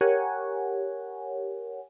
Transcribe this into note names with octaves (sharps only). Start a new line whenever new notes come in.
G4 A#4 C#5 F#5 G#5